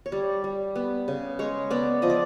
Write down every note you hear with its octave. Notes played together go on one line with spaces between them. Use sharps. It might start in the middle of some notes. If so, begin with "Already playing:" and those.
C#5
G3 D5
G3
B3
C#3
G#3 C#5
B3 D5
F3 D#5
D5